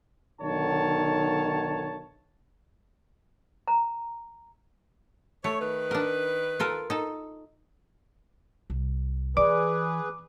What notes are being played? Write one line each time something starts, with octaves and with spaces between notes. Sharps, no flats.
B1 D3 D#3 C#5 A5
A#5
A3 C#5
D#3 B4
D4 A#4
F4 A4 A#4
D#4 A4
C2
E3 G#4 B4 D5 D6